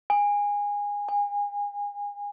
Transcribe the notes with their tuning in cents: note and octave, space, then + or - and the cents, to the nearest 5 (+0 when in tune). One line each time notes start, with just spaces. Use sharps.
G#5 -20
G#5 -30